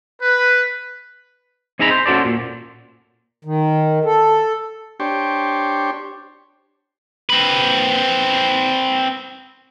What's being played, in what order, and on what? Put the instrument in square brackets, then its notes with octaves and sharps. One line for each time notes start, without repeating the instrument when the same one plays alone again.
[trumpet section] B4
[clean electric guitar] C4 D#4 G#4 E5 A#5 B5
C5
C#4 F#4 A4 C5 D5
A#2
[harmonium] D#3
A4
[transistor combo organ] D4 G4 C5 C#5
[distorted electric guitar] C4 B4